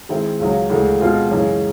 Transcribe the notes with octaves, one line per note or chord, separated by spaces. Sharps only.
D#3 G#3 C4 E4
C#2 C#3 F#3
D2 C#3 E3 G#3
B2 G#3 C4 F4 G#4
F#2 C#3 E3 G#3 C#4